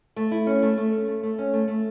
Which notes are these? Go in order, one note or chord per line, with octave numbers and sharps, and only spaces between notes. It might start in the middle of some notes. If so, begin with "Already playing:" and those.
A3
E4
C#4
A3
A3
C#4
A3
A3
C#4
A3
A3